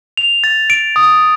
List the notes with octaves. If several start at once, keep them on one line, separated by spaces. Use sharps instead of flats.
F7
A6
D7
D#6